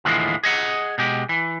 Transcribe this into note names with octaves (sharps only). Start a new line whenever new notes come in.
D#2 A2 D3 E3 F3 G#3
G#4 D#5 F#5
B2 G#3 G4
E3